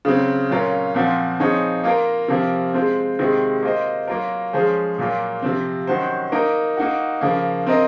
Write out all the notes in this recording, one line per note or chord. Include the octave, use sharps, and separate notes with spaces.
C#3 F#3 C4
A#2 F#3 C#4 F4 A#4
A#2 F3 C4 F#4
F3 C4 D#4 G#4 C#5
A#3 F4 A#4
C3 F3 A#3
G#3 C4 F4 C5
C3 D#3 G#3 C4 F4
A#3 F4 C5 D#5
F#3 A#3 F4 A#4
F3 G#3 C#4 G#4 C5
A#2 F#3 A#3 F4
C3 F3 C4
D#3 F#3 C#4 F#4 C5
A#3 D#4 A#4
A#3 D#4 F#4
C#3 F3 A#3
C4 F4 A#4 D#5